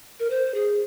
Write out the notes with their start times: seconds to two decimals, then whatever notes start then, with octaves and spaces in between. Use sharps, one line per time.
0.20 A#4
0.30 C5
0.54 G#4